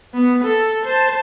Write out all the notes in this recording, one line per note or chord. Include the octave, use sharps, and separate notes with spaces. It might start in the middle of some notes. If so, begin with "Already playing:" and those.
B3
A4
C5 A5